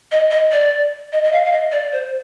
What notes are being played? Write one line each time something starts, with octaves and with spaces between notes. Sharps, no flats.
D#5
D#5
D5
D#5
D#5
F5
F5
D#5
D5
C5